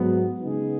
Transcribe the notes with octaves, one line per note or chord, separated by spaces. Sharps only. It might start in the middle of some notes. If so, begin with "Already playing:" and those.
Already playing: G#2 F#3 B3
C#3 G#3 B3 D#4 G#4